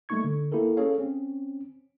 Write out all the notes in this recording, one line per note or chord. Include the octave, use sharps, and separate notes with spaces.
G3 A3 A#3 D#4 C#6 G#6
D3
A#3 E4 G4 A4 A#4
C#4 G#4 A4 C#5 F5
C4 C#4